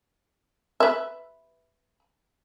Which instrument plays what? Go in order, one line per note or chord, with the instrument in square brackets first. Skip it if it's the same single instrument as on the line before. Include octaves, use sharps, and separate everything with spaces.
[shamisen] B4 E5